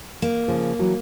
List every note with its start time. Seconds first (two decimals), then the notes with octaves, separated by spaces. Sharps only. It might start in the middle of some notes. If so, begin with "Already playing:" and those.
0.22 A#3
0.48 C#3 F3
0.79 E3 F#3